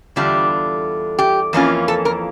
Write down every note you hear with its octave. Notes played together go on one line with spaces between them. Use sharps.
E2 D3 G3 D4 F4 G4
G4
F2 E3 A#3 C#4 F4
A4
A#4